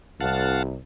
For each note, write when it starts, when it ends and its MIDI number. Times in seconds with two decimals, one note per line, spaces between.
0.20 0.78 36
0.20 0.63 77
0.20 0.63 78
0.20 0.63 81